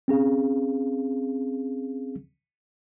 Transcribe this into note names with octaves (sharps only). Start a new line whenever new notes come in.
C4 C#4 G#4 F5